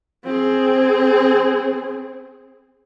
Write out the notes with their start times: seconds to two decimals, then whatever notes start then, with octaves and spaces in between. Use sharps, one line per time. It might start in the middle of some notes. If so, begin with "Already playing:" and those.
0.25 C4 G#4